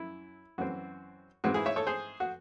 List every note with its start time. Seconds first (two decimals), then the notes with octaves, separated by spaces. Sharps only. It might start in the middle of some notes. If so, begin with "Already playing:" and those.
Already playing: F#2 E4
0.58 F#2 E3 C4 F#4
1.44 G#2 E3 G#3 C4 F#4
1.54 E4 G#4
1.66 C#5 E5
1.76 A4 C#5
1.87 G#4 C5
2.20 F#4